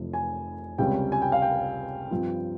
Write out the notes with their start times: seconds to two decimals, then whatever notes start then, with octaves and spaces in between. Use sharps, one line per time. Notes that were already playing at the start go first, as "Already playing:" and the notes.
Already playing: F1 F2 C3 E3
0.14 G#5
0.78 C#2 C3 G3 C#4 G5
1.12 G#5
1.22 G5
1.32 F5
1.42 G5
2.11 G2 F3 C4 F4